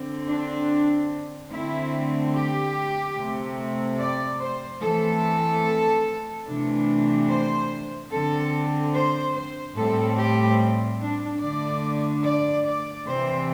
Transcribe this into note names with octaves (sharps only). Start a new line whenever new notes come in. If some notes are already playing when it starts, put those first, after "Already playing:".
Already playing: D3 C4
D4
D3 A3 C4 E4
G4
C3 A3 C4
D5
C5
E3 A3 C4 A4
C3 E3 A3 D4
C5
D3 C4 A4
C5
C5
A2 G3 C4 A4
G4
D4
D3 A3 D4 D5
D5
D5
C3 E3 C4 C5